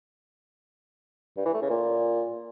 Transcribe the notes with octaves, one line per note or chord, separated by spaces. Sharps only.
G2
E3
A3
C#3
A#2